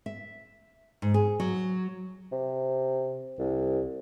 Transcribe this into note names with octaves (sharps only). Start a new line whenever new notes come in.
E5
G#2
G#4
F#3
C3
C2